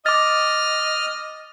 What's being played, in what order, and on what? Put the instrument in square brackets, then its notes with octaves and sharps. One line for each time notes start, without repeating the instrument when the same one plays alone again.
[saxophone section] D#5 [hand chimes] D6 A6 [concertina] F6